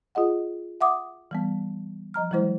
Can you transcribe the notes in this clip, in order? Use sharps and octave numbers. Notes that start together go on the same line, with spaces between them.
F4 G#4 D#5 F#5
E5 F#5 D6 D#6
E3 G3 B3
F3 D#5 A#5 F6
E3 F#3 G#3 E4 C5